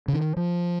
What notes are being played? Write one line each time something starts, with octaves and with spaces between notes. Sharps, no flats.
C#3
D#3
F3